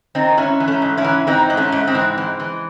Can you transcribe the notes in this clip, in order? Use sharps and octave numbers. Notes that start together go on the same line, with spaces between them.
D#3 C4 D#4
G#2 C#4 E4
E3
A3 C#4
G#2
C#4 E4
E3
E3 C4 D#4
G#2
A3 C#4
G#2
G#3 C4
E3
E3
E3